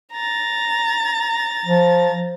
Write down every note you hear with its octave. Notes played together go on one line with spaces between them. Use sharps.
A#5 A6
F3